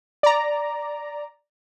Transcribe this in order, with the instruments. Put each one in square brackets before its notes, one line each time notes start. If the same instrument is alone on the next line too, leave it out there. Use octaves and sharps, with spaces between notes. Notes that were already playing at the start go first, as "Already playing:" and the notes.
[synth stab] D5 A#5